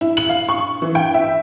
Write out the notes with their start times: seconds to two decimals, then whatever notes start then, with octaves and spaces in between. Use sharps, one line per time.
0.01 E4
0.17 F#7
0.29 F5
0.49 C#6
0.82 E3
0.95 G5
1.14 E5